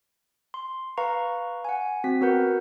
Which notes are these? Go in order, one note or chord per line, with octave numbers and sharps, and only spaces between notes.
C6
B4 F5 A#5 C#6
F#5 G#5
C4 F#4 B6
B3 F#4 A#4 B4 F#5 G6